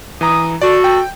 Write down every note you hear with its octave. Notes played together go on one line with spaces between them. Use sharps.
E3 A#5 D#6
F#4 A4 D5
G5